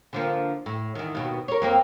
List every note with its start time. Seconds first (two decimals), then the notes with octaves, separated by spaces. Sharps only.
0.13 D3 F3 A#3
0.66 A2
0.95 E2 D#3
1.15 D#2 B2
1.48 A#4 C#5
1.62 F2 A#3 C4